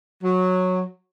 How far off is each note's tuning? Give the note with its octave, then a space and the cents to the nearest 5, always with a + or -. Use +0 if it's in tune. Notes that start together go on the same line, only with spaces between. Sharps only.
F#3 -10